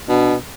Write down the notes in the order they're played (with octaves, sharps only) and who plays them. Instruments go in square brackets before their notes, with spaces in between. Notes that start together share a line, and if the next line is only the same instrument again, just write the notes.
[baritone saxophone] B2 [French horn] D4